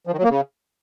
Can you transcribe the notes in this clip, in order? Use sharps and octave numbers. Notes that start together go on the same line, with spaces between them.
F3
D#3
F#3
A#3
C#3